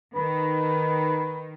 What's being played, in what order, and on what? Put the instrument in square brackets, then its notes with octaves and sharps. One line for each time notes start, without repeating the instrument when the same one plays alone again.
[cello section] D#3 [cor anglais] B4